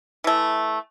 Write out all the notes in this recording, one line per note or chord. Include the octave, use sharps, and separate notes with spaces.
E3 A3